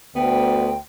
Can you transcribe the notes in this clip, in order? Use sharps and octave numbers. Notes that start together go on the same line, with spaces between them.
D2 B3 G5